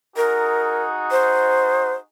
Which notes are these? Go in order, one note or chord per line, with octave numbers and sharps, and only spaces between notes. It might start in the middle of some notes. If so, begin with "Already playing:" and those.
D#4 F#4 G#4 A#4
C5